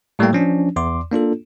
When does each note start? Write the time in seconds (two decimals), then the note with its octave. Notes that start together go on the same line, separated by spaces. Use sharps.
0.19 A2 G3 A3 A#3 G5
0.33 F3 C#4 D4
0.76 E2 C6 D6
1.12 A#3 D4 F4 A4